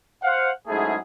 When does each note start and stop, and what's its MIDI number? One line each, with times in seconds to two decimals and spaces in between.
0.23 0.50 72
0.23 0.50 77
0.23 0.50 78
0.68 0.96 44
0.68 0.96 54
0.68 0.96 57
0.68 0.96 61
0.68 0.96 64
0.68 0.96 68